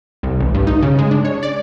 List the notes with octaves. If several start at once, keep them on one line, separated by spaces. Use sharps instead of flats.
C2
A1
G2
D#4
C#3
G#3
D4
C#5
D5